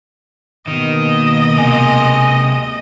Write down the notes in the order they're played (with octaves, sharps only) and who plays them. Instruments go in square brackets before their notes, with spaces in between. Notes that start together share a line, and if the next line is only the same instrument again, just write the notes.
[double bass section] B2 A#3 [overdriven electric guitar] D#3 [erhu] D#5
[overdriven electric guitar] C3 G#3 [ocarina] G#5